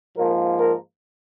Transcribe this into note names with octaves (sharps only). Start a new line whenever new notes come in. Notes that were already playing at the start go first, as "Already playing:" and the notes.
G#2 F3 A#3 A#4
A#4